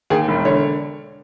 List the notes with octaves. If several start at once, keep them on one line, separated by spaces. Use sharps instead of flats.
D#2 G#4
E1
D3 C#5